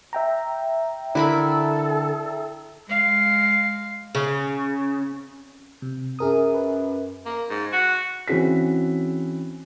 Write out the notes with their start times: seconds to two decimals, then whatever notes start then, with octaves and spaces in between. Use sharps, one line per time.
0.13 E5 G5 A#5
1.15 D3 E4 A4 A#4 B5
2.88 G#3 F5
4.15 C#3
5.82 C3
6.19 F#2 G#4 A#4 D#6
6.54 B4
7.26 A#3
7.50 G#2
7.73 F#4
8.28 E3 C4 C#4 F#4 G#4 B6